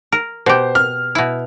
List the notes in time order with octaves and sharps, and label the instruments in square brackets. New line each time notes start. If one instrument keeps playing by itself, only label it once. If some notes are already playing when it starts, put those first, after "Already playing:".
[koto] A#4
[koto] B2 G4 [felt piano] C5
[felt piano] F6
[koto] B2 E4